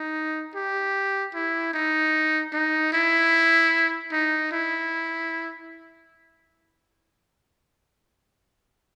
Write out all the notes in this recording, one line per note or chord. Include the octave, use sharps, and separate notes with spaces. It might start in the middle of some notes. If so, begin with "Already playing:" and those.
Already playing: D#4
G4
E4
D#4
D#4
E4
D#4
E4